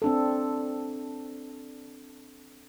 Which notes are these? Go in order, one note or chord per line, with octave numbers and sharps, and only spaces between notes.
C4 D4 A4